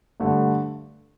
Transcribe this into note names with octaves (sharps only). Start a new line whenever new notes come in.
G2 D3 A3